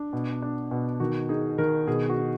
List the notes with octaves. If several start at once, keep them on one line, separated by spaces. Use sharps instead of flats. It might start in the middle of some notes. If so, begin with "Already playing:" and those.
Already playing: D4
B2
D4
B2
D#3 F#4
D#4 G#4
D#3 A#4
B2 G#4
F#4
D#4